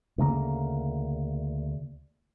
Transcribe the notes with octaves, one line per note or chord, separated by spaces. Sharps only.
D2 C#3 G#3 A#3